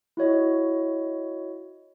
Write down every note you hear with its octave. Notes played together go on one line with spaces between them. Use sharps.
E4 F#4 C#5 D#5